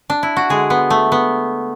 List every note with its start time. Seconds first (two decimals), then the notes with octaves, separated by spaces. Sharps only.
0.10 D4
0.23 E4
0.37 F#4
0.49 D3 G#3 G#4
0.70 B3
0.90 A3
1.12 B3